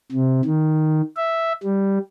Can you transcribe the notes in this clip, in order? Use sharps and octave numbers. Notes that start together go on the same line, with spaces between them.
C3
D#3
E5
G3